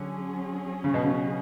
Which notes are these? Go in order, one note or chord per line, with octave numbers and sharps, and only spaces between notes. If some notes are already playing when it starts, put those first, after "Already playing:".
Already playing: D3 F#3 C#4 G#4
C#3
B2
C#3